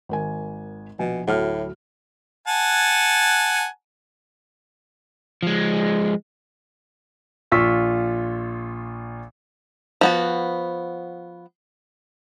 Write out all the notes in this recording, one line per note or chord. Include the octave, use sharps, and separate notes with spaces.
G#1 A#4 G#5
A#1 B2 G#5
D2 A2 F#3 F6
F#5 G#5 A5
F3 G#3
A#1 F4 F5 C#6 E6 B6
F3 B3 F#4